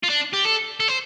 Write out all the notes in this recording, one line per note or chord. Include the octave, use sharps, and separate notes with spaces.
F4
D4
G4
A4
A4
C5